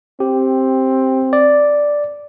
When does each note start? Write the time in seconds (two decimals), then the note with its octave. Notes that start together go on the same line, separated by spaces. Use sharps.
0.20 C4 G4
1.33 D5